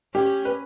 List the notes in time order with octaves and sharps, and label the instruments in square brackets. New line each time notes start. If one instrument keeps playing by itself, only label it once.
[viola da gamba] C#4 [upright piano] G4
[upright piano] B4